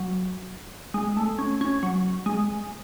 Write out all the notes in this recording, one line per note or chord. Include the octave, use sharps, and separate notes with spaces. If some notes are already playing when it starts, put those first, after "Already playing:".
Already playing: F#3
G#3
A3
C#4
C#4
F#3
G#3